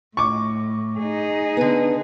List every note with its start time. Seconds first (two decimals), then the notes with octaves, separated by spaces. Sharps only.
0.17 A2 C#6 D6
0.99 D#4 G#4
1.57 D3 B3